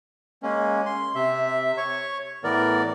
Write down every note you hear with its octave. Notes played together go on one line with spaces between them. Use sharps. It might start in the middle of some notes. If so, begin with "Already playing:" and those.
G#3 A#3 C#4
C6
C3 E5
C#5 C#6
A2 E3 B3 A#4 D5